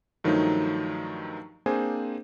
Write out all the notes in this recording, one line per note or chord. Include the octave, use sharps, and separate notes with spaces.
G2 D#3 F3 F#3 A3 D#4
A#3 C4 D4 G#4 C5 G#5